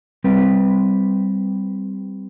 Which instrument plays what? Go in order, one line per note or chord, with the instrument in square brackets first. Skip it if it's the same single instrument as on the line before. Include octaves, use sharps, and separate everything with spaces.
[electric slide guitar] G3 C4 B4